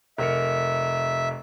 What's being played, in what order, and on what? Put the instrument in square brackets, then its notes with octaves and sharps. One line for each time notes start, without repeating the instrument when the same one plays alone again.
[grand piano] F1 A#4 C#7 [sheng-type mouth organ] E5